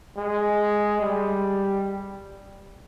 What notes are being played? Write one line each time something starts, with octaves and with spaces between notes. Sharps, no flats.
G#3
G3